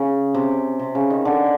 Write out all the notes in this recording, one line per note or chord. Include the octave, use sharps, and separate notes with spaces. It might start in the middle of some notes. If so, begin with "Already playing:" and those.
Already playing: C#3
C3
C3
C#3
D#3
D3